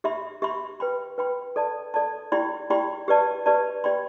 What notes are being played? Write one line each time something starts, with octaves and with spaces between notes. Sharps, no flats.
G4 E5 B5
G4 E5 B5
B4 G5 B5
B4 G5 B5
A4 D5 A5
A4 D5 A5
E4 G4 D5 G5 B5
E4 G4 D5 G5 B5
G4 B4 D5 A5
G4 B4 D5 A5
G4 D5 G5 B5